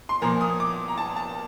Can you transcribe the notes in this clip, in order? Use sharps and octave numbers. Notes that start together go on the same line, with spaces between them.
C6
A#2 F3 A#3 A#5
D#6
D6
A#5
A5
A5